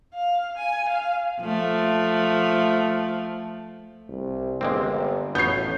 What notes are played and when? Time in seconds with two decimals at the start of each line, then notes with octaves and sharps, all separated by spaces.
0.14 F5
0.57 G#5
0.88 F5
1.42 F3 A3
4.09 C2
4.61 G1 G#3 A#3 C4
5.35 A1 B3 C#5 G6 C7